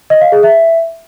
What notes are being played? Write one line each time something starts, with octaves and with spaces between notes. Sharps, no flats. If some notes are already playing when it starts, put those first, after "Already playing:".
D#5
F5
G#4
E5